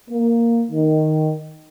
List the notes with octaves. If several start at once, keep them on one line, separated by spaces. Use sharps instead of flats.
A#3
D#3